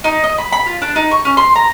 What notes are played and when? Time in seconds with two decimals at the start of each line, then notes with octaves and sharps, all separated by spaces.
0.04 D#4
0.24 D#5
0.38 B5
0.52 B5
0.66 F4
0.82 D4
0.96 D#4
1.11 C#6
1.25 C#4
1.37 C6
1.55 A#5